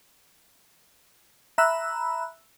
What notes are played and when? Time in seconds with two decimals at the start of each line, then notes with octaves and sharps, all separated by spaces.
1.58 E5 A#5 B5 E6 F#6